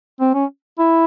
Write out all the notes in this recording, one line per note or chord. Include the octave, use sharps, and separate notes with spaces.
C4
C#4
E4